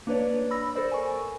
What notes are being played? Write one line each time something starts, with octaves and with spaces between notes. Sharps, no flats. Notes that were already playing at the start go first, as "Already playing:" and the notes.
A#3 D4 B4 C#5 D5
B5 E6 A#6
A4 A#4 C5 D5
G#5 C#6